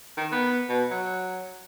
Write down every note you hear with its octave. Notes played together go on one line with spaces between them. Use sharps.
D#3
B3
B2
F#3